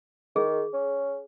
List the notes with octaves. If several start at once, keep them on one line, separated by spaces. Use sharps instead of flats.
D#3 G#4
C#4